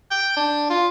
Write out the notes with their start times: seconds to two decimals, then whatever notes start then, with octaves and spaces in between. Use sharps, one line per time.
0.11 G5
0.37 D4
0.70 F4